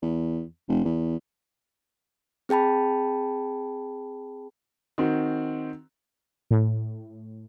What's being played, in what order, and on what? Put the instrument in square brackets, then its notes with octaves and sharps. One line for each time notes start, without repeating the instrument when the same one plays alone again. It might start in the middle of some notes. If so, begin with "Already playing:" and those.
[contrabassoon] E2
F1
E2
[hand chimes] C4 G#4 G5 A5 B5
[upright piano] D#3 C4 F#4
[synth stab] A2